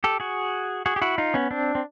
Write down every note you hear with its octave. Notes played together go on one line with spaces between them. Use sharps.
G4 A4
F#4 G#4
F#4 G#4
G4
E4 F#4
D#4 F4
B3 C#4
C4 D4
C4